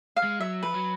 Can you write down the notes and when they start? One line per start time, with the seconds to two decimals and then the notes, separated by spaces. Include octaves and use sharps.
0.16 F5
0.23 G#3
0.40 F#3 E5
0.63 F3 B4
0.74 F#3